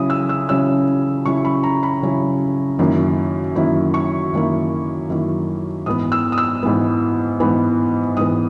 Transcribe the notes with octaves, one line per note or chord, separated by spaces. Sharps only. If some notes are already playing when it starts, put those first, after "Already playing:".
Already playing: C#3 F#3 C#4 E4 D#6
E6
E6
C#3 F#3 C#4 E4 E6
C#3 F#3 C#4 E4 C#6
B5
A#5
B5
C#3 F#3 C#4 E4
F#2 D#3 A#3 E4
F#2 D#3 A#3 E4
C#6
F#2 D#3 A#3 E4
F#2 D#3 A#3 E4
G#2 E3 B3 D#6
E6
D#6
E6
G#2 E3 B3
G#2 E3 B3
G#2 E3 B3 D#6